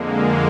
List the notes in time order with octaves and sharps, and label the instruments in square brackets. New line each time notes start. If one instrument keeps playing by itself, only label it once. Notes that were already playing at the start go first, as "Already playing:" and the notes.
Already playing: [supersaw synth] F2 D3 G#3 A#3